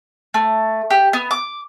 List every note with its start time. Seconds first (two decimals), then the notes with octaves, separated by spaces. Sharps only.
0.34 A3
0.90 G4
1.13 B3
1.31 D6